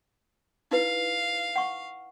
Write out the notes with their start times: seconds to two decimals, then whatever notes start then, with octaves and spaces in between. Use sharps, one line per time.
0.71 D#4 E4 B4 F5
1.56 F#5 C#6